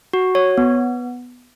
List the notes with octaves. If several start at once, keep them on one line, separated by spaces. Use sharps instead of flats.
F#4
C#5
B3